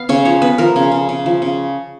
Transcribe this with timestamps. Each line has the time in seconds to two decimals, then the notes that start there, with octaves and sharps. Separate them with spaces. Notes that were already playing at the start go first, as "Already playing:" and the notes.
Already playing: B3 F5
0.09 C#3 C#5
0.25 F3 C#5
0.42 B3 B4
0.58 F3 A#4
0.76 C#3
0.92 C#3
1.09 C#3
1.26 F3
1.42 C#3